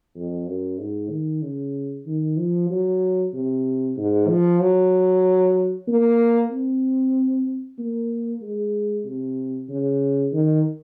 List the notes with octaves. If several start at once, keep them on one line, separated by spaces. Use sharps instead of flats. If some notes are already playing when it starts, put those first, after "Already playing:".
F2
F#2
G#2
D#3
C#3
D#3
F3
F#3
C3
G#2
F3
F#3
A#3
C4
A#3
G#3
C3
C#3
D#3